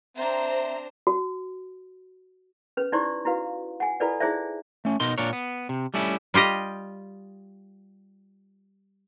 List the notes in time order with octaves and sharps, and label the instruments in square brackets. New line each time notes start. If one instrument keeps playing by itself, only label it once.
[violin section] C4 A#5 [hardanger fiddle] D4 C5 [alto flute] E5
[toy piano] F#4
C#4 B4
D#4 E4 G4 C5 D5 C6
E4 F#4 B4 F5
F#5 G#5
E4 F4 A4 B4 D5 D#5
D#4 E4 G#4 C5 D5 E5
[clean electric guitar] A3 C#4
B2 D#4 A#4 C6
A#2 D4 A#4 C#5
B3
C3
G3 A3 C#4 E4
[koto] G3 F4 G4 D#5